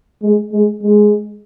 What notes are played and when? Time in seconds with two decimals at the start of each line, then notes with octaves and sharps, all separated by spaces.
0.23 G#3
0.53 G#3
0.83 G#3